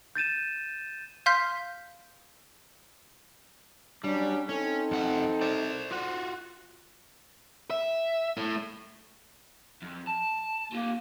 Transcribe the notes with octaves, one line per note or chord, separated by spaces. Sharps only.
G6 A6 D#7 E7
F5 C6 F6 G6 B6
F#3 G3 C#4 D4
C4 C#4 D#4 A4
F2 F#5
C5 D5
F4 F#4
E5
A2
F2
A5
A#3 F4 G4